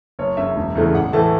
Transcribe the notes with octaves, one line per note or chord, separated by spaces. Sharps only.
F#1 C#5
F#2 C#3 E5
E1
E2 C#3 E3 A3
A1 F#5
A2 E3 A3 A5